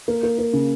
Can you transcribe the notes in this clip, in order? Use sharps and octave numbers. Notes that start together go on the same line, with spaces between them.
A#3
A#3
A#3
C#3